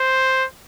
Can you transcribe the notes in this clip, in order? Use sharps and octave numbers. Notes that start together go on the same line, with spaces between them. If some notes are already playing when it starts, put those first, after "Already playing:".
Already playing: C5